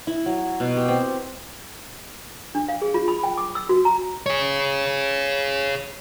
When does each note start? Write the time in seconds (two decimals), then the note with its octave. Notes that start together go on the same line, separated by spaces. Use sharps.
0.07 E4
0.26 F#3
0.60 B2
0.76 G4
0.88 C4
2.55 D4
2.69 F5
2.82 G#4
2.94 F4
3.08 B5
3.23 G5
3.38 D6
3.55 E6
3.69 F#4
3.85 A#5
4.26 G#4 C#5